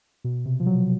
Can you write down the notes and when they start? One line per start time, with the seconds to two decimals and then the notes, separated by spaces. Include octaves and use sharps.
0.24 B2
0.46 C3
0.60 F3
0.66 F#3